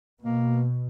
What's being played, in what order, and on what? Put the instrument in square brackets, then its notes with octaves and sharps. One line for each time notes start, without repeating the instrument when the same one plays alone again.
[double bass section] B2 [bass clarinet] A#3